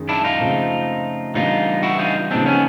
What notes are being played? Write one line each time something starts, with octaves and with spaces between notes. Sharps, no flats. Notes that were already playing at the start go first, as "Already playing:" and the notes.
Already playing: F#2 D#3 G#3
D4 E4
D#4 F4
C#3 F3 A3 C4
C#3 E3 G3 B3 D4 D#4 F4
E4 F#4
D#4 F4
C#3 F3 A#3 C4 D4 D#4
B3 C#4